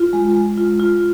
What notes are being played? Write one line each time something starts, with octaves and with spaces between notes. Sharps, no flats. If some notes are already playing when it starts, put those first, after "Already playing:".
Already playing: F4
G#3
G#3
F4
F4